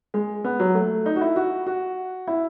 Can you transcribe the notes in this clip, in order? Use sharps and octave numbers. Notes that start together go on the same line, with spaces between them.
G#3
B3
F#3
A3
D#4
F#4
E4
F#4
F#4
E4